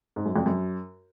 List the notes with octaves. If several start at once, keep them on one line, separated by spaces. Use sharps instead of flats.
G#2
F#2
F2
F#2